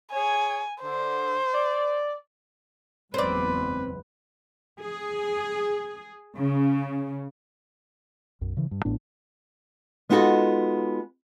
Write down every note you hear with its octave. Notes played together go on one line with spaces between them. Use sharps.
G#4 C#5 G#5
D3 C5
D5
F#1 E2 G#2 C4 B4 D5
G#4
C#3
B1 F#2
C#3 E3
G2
A1 A2 B3 D4
G#3 B3 D#4 F4 F#4 A4